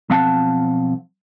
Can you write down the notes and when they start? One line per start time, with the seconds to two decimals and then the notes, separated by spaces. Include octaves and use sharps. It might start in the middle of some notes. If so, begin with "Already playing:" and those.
0.10 B1 F3 C4 F5 F#5 A5